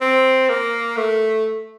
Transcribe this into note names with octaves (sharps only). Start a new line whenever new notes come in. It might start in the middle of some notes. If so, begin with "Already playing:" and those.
C4
A#3
A3